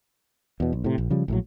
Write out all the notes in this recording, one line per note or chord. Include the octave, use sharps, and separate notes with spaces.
E2 B2
B1
A2 C3
A#1
C#3 F3 G3
A#1 A2 F#3